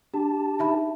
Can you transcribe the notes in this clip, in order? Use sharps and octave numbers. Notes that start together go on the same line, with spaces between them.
D4 G4 A5
D#4 E5 B5